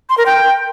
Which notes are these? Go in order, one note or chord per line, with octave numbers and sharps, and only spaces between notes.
C6
A#4
G5